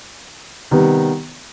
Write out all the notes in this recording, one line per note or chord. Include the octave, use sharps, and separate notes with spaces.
C3 D#3 G3 B3